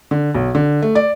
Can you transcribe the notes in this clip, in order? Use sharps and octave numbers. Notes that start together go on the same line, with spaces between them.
D3
B1
D3
A3
D5